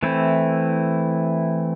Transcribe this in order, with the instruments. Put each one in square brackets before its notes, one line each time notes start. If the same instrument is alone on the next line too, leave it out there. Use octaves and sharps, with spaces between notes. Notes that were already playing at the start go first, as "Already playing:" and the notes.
[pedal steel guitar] E3 A3 C4 E4